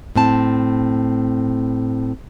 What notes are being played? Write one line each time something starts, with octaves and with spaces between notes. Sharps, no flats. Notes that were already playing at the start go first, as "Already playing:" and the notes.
A2 C4 A5